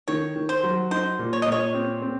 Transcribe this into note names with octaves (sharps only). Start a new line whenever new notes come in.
D#3 C#5
D#3
C5
F#3
D#4 C5
A#2
C#5
D#5
A#2
C#5
C4
C4